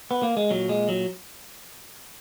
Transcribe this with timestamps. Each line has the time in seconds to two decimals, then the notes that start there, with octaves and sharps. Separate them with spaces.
0.11 B3
0.23 A#3
0.37 G#3
0.50 A#2 F#3
0.69 G#3
0.89 F#3